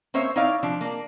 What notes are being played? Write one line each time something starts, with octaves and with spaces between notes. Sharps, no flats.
A#3 C#4 C5 C#5 E5
D#4 E4 C#5 D5 F5
F3 D4
A#3 D4